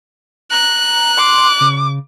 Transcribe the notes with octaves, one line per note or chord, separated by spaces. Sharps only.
A#5 F#6
C6 D6
C#3